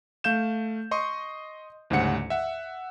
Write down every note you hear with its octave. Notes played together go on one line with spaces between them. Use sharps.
A3 F5 G6 E7
D#5 C6 C#6 D#6
D2 G#2 C#3 G3 F#5 C#7
E5 F#5